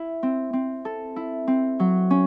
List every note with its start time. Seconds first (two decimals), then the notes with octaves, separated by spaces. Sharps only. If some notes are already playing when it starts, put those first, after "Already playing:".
Already playing: E4
0.23 C4
0.53 C4
0.85 A4
1.16 E4
1.47 C4
1.80 F#3
2.10 C#4